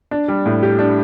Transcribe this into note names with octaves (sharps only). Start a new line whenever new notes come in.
D4
G3
A2
G4
D4